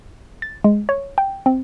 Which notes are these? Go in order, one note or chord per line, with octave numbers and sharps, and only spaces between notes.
A6
G#3
C#5
G5
C4